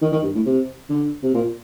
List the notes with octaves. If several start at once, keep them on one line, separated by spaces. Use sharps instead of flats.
D#3
D#3
G2
A2
C3
D3
C3
A#2